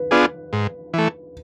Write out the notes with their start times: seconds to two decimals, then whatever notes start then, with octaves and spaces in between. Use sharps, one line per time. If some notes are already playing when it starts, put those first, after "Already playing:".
Already playing: B4
0.11 B3 D4 F4 G#4
0.53 G#2
0.94 E3 A3